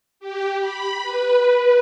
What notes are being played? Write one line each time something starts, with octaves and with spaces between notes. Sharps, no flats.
G4
B5
B4